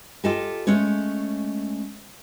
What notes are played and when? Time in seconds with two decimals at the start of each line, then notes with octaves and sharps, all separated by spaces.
0.24 F4 G4 A4 D#5 G#5
0.67 G#3 A3 C#4 C#5